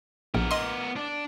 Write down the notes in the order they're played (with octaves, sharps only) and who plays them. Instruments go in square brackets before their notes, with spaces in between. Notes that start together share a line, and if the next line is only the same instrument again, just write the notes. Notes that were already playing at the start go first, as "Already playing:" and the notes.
[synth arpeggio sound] A#1 [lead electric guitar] B3 A#4
[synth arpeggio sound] D#5 C6
[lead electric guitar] D4